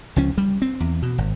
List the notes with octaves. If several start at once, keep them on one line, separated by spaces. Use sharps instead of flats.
C#2 F3 C#4
G3
C4
E2
B2
G#1